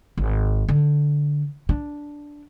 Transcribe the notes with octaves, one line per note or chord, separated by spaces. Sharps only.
G#1
D3
D4